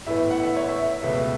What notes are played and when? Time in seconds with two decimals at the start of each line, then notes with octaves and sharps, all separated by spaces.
0.07 A2 E3 B3 E5
0.31 F#5
0.43 E5
0.56 C#5
0.69 E5
1.02 C#2 B2 A3